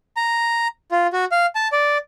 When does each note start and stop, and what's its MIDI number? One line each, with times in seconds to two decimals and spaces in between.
0.17 0.67 82
0.91 1.07 65
1.13 1.25 66
1.32 1.46 77
1.55 1.68 81
1.72 1.98 74